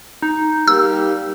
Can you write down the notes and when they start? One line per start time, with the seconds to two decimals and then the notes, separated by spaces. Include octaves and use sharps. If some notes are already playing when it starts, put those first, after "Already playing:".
0.22 D#4
0.68 G3 A#3 G4 E6